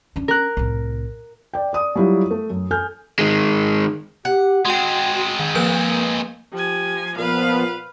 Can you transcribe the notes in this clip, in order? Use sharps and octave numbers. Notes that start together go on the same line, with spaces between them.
C#4 D4
A#4 F#6
C2 A2
D5 G5
D5 D#6
F#3 G3 E4 F4 G4
A3
F#2
A4 G#5 F6 G6
D#3 G#3
G4 F#5
G#3 C4 F#4 G5 C6
D#3
F3 A#3 B4 G6
F3 G4 G#5
A#2 F3 B3 B4 F5